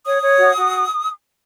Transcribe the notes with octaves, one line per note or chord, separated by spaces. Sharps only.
C#5 D#6
C#5
F#4
F#4